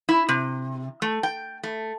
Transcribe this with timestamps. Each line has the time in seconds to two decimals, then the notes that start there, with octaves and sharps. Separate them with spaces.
0.09 E4
0.29 C3
1.02 A3
1.23 G5
1.63 A3